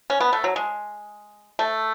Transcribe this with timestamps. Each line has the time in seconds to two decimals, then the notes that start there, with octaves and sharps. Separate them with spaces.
0.10 C#4
0.20 B3
0.33 A3
0.44 F#3
0.56 G#3
1.59 A3